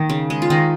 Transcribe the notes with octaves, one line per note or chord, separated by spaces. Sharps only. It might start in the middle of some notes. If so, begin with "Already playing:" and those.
Already playing: D#3 A#3
C#3
G#3
F4
D#3 D#4